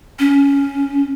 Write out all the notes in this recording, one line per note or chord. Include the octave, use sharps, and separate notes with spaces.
C#4